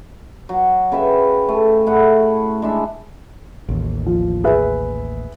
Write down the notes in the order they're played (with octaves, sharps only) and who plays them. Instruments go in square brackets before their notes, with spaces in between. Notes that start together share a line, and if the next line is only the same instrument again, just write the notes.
[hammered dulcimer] F#3
C#3 B4 E5 G5
A3
A2 E4 F#5
G#3 D4 E5
[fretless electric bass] A1 D#2
[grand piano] F3
G#4 B4 E5